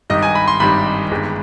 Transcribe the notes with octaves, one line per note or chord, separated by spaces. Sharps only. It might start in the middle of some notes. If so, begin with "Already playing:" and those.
G#1 G2 D#3 G3 D#5
G#5
B5
C6
G#1 G2 D#3 G3 B5
G1 G2 D#3 G#3